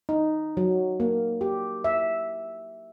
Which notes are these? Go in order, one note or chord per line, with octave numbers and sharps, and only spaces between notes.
D#4
F#3
A#3
G4
E5